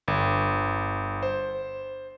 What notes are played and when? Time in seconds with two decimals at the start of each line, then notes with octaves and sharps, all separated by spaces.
0.08 G1
1.23 C5